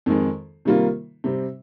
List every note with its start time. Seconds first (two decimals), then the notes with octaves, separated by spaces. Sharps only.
0.06 F2 D#3 G#3
0.65 C3 D#3 G3 A#3 F4
1.24 C3 G3 C4